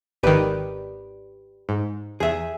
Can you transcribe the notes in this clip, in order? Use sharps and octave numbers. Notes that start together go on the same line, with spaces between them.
G#1 D#3 G4 B4 D5
G#2
E2 G#4 E5